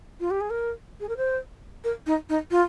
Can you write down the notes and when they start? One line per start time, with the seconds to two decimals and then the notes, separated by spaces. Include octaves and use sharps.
0.20 F4
0.30 G4
0.40 G#4
0.50 A#4
1.00 G#4
1.08 A#4
1.17 C5
1.84 A#4
2.06 D#4
2.29 D#4
2.50 F4